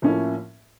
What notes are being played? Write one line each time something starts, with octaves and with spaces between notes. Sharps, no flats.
A2 F3 A#3 C#4 E4